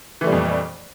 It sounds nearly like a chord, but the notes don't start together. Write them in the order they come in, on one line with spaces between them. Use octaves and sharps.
E3 A3 G3 A#2 F2